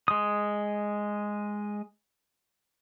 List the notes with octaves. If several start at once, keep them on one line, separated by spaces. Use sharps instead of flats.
G#3 D#6